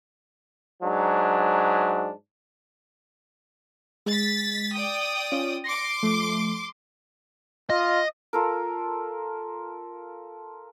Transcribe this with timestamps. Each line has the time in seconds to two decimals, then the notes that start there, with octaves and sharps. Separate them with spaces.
0.83 G#2 F#3 D4
4.06 G#3 A6 B6
4.73 D5 G5 D#6
5.32 C#4 F4
5.64 C6 D6 A#6 C#7
6.03 F3 A3
7.70 F4 D#5
8.33 F4 A4 A#4